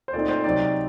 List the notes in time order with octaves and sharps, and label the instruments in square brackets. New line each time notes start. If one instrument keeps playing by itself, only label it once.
[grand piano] C5
A#2 A3 C4 D#4 D5
C5
C3 F#3 C4 D#4 D5